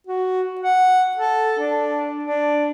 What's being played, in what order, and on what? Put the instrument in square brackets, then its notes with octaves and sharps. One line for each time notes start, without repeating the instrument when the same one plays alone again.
[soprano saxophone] F#4
F#5
A4
D4
D4